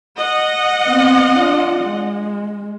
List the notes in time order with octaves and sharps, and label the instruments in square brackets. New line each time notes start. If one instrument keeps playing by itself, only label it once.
[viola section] D#5 F#5
[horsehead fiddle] B3 C4
D4 F4
G#3